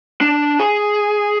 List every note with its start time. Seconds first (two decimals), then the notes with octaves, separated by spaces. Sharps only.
0.21 D4
0.59 G#4